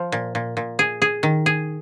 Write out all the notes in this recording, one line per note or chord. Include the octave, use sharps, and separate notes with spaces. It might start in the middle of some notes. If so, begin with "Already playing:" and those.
Already playing: F3
A#2
A#2
A#2
G#4
G#4
D#3
G#4